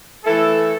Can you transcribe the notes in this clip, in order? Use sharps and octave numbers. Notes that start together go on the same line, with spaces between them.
E3 A3 E4 A4